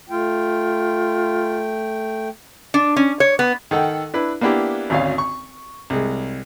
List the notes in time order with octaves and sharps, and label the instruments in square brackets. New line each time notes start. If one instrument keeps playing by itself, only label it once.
[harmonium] A3 G5 [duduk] F4
[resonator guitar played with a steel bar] D4
C#4
C#5
B3
[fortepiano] D#3 A4 F#5 G5
D4 E4 B4
A#3 B3 D4 E4 G4
G#1 D2 C#4 F5
C#6
C2 G#3